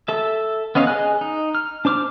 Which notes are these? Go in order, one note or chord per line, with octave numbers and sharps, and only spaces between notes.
A4 E5
B3 C#4 D#5 F5
G#4 D#5 G#5 F#6
D#4
F6
D4 C5 D6 F6